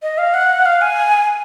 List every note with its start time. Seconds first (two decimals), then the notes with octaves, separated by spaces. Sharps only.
0.03 D#5
0.18 F5
0.34 F#5
0.66 F5
0.81 G#5